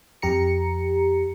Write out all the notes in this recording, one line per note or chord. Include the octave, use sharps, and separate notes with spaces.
F2 G4 A#5 C#7